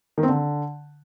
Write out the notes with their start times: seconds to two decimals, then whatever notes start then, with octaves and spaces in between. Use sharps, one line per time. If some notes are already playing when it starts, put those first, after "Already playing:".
0.18 D#3
0.23 C4
0.29 D3